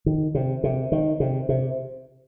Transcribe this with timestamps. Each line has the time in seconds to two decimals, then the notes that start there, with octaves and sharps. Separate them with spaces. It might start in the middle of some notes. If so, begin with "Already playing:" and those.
0.06 D#3
0.35 C3
0.64 C3
0.92 D#3
1.20 C3
1.49 C3